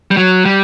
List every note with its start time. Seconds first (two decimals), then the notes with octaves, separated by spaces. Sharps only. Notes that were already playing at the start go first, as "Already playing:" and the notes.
0.11 G3
0.17 F#3
0.46 G3